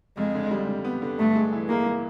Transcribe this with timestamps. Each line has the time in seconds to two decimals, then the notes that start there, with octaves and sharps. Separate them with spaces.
0.17 F2 G#3
0.34 D3
0.51 G3
0.67 D3
0.84 B3
1.02 D3
1.19 G2 A3
1.35 G#3
1.53 E3
1.69 G#3 A#3
1.86 G#3